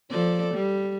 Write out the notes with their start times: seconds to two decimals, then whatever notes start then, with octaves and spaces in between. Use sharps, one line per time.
0.11 F3 A4 D5
0.54 G3